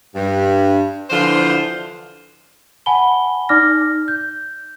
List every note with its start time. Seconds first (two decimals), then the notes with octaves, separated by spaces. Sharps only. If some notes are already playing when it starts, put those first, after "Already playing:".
0.15 G2
1.10 D3 E3 F3 D4 F4 C5
2.86 F#5 G#5 A5 B5 G7
3.49 D#4 D5 D6 F6 A#6
4.08 G6